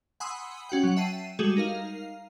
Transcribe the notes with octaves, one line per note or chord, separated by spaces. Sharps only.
F#5 G#5 B5 C6 D#6 E6
C#4 F#4 F#5 G5
F#3 F#5
E5 G5 A5 C7 D#7
G3 G#3 F#4 G#4 A4
D#4 A#4 F5